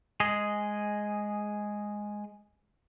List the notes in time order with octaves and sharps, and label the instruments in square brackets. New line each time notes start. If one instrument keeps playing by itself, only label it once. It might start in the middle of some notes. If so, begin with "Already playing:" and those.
[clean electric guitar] G#3 G#4 D#5